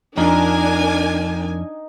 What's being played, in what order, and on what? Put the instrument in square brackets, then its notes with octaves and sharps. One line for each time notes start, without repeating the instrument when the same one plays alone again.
[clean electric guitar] F2 F3 [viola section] D4 A#4 G#5 [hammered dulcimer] D#4